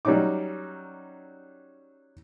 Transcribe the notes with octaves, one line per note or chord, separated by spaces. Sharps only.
F#3 G3 C#4 D#4 D6